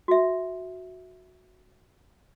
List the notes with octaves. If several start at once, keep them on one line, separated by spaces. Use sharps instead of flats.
F#4 E5